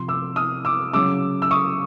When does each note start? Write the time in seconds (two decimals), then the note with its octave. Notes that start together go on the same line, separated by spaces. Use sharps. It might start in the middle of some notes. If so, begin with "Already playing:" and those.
Already playing: C3 F3 C6
0.08 D6 E6
0.36 D#6 F6
0.65 D6 E6
0.93 C#3 F#3 D6 E6
1.42 E6
1.51 C#6 D#6